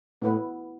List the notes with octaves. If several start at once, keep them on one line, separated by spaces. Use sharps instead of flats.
A2 B3 E4 B4 F#5